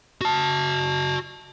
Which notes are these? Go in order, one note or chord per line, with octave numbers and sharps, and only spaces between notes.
F#4 A5